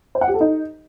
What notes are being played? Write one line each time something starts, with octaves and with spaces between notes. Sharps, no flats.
C5
F#5
G4
A4
D#4